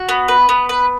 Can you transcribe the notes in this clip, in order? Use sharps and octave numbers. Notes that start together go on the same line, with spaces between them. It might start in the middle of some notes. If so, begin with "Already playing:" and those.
Already playing: F#4
B3
B4
B3
B4